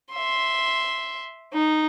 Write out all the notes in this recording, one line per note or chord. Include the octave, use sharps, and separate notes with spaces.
E5 C6
D#4